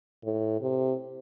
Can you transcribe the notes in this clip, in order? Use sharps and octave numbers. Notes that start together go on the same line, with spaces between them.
A2
C3